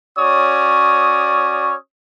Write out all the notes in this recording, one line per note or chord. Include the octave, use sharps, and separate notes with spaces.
C#4 F#4 C#5 D5 D#6